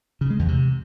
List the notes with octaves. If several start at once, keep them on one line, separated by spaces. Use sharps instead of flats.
C#3
G#3
E2
C3